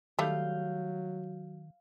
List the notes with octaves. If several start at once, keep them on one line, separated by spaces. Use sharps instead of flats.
D#3 F#3 G3 A3 F5 G6